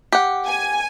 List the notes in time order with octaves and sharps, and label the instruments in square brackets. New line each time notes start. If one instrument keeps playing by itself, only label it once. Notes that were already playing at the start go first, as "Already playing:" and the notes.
[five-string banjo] G4 F#5
[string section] G#5